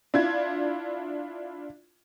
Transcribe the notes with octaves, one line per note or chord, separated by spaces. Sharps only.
D4 E4 F4 G#6